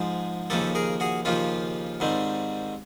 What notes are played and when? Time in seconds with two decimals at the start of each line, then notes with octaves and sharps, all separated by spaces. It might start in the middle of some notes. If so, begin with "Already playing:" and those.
Already playing: G#2 F3 G#3
0.50 D#2 C#3 F3 A#3 G4 A4
0.75 G#4 A#4
1.00 F#4 G#4
1.25 D#2 C#3 F3 A#3 F4 G4
2.00 G#2 D#3 G3 C4